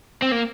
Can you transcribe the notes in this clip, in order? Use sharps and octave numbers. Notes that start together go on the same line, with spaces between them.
C4
A#3